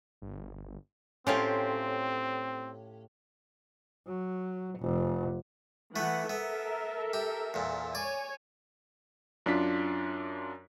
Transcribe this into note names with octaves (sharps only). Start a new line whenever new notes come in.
G1
A2 C4 C#4 F4 G4
F#3
F1
E3 A3 B3 F#5
B3 A4 A#4 E5
G4
E2 A#2
C#5 D5 G#5
F#2 D4 F4 B6